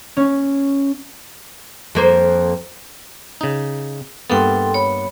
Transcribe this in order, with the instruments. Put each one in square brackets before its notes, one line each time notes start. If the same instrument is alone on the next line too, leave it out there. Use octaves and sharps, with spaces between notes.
[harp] C#4
[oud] F2 A#3 C5
[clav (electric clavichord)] C#3 D#4
[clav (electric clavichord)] G2 A#3 B3 [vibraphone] A4 G5 C6
[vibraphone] C#5 B5